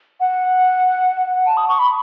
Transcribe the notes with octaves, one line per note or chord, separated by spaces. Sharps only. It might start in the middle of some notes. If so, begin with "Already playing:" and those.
F#5
A5
D#6
C#6
B5